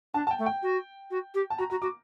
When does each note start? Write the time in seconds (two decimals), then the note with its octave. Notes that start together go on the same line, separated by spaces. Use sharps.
0.14 D4 A5
0.27 A5
0.31 G5
0.38 A3
0.46 G5
0.62 F#4
1.11 F#4
1.34 G4
1.50 A5
1.58 F#4 A#5
1.70 F#4 A#5
1.82 F#4 D6